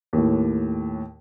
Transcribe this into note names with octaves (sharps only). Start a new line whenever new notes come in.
D#2 A2